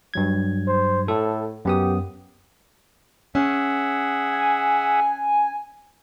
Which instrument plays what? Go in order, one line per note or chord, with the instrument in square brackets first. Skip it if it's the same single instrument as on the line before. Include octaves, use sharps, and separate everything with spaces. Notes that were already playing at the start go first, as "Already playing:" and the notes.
[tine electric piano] G2 F#3 G#6
[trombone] C5
[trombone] A2 [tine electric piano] A4
[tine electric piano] F#2 B3 D#6 [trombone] G4
[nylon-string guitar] C#4 [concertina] G#4 E5 F#5
[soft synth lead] G#5